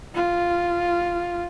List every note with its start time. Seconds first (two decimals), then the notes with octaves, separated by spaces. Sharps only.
0.15 F4